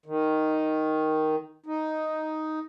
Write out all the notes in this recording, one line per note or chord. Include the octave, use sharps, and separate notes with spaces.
D#3
D#4